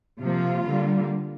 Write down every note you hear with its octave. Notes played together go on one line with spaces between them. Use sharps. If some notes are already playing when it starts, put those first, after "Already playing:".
C3 F3 A#3 F4
D3 G3 A#3